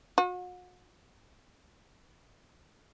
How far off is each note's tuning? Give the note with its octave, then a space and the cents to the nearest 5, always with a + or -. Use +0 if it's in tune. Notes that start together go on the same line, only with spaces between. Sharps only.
F#4 -40